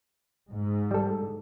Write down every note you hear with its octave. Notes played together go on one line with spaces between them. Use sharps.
G#2
G3 A4